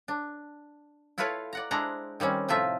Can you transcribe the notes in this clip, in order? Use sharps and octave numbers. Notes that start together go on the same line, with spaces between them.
D4
E4 F4 A4 B4 C#5 F5
D5 F#5 A#5
G#3 D4 E4 C5 F#5 A#5
D#3 G3 C4 C#4
A2 C3 F3 D#4 F4 E5